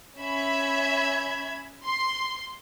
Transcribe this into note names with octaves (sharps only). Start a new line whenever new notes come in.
C#4 E5 B5 G#6
C6